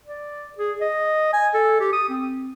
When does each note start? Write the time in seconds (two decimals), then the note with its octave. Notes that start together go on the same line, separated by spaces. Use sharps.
0.05 D5
0.58 G#4
0.81 D#5
1.33 G#5
1.54 A4
1.80 G4
1.93 D#6
2.09 C4